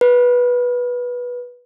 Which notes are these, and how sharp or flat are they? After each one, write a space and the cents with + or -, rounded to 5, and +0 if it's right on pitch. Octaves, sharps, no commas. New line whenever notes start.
B4 -15